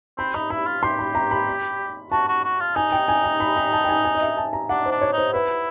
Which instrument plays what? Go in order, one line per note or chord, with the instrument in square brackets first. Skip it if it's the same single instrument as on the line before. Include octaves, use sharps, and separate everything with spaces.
[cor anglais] C4 [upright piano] B5
[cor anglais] D#4 [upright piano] B5
[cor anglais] E4 [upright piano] B5
[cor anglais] F4
[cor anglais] G4 [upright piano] C6
[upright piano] B5
A#5
B5
[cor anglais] F#4 [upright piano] A5
[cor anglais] F#4
F#4
F4
[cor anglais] D#4 [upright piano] G#5
[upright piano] G5
G#5
A#5
B5
A#5
A5
G5
G#5
G#5
D#5
E5
A5
A#5
[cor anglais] D4 [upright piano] F#5
[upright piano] C5
[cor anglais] D4
[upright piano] C#5
[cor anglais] D#4
[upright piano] C5
[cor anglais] E4 [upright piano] B4